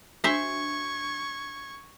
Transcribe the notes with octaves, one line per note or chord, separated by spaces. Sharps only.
D4 F#4 C5 E5 C#6 G#6